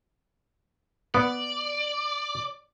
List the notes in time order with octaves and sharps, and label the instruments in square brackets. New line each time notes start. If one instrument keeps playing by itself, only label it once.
[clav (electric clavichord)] B3 [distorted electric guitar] D5